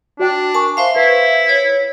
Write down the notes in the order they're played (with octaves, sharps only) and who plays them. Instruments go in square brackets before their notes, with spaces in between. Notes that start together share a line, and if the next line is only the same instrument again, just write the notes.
[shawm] D4 [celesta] F#4 D5 G5
[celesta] A#4 G#5 C#6 [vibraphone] A5
[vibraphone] C5 E5 F5 [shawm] C6
[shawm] E4 [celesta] B4
[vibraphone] C#5